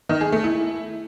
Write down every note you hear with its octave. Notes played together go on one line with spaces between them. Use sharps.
D#3
G#4
A3
E4